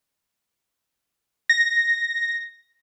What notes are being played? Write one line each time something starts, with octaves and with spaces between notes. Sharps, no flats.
A#6